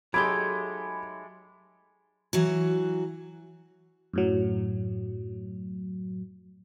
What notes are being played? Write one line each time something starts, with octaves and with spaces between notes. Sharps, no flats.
F#3 G#3 A3 D#4 G4 B5 D6 G#6
E3 F#3 F#4
F#2 A2 F#3